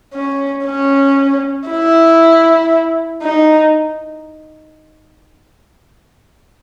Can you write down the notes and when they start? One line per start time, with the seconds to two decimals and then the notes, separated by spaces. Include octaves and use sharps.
0.14 C#4
0.65 C#4
1.68 E4
3.22 D#4